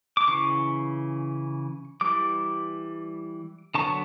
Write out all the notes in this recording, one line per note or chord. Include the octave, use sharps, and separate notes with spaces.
D6
C#3 E3 C#6
E3 G3 D6
D3 F#3 B3 A5 C#6